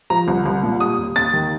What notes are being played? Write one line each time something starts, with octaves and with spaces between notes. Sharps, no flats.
F3 A#5
C2
C2
A#2
G3 D#6
D#2
D#2 A6
D#3